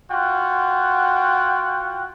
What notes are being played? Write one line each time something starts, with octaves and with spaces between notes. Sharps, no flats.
F4 F#4 F#5 G5